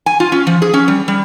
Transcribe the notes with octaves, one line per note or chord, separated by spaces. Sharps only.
G#5
F4
C#4
F3
G#4
C#4
G3
G3